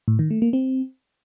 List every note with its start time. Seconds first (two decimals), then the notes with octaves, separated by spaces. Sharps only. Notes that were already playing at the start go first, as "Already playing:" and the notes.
0.08 A2
0.19 D#3
0.30 A3
0.42 A#3
0.53 C4